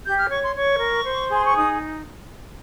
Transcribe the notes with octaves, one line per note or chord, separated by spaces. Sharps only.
G4 G6
F6
C#5 C#6
C6
C#5 C#6
A#4
C5
G#4 C6
C#6
D#4 D#6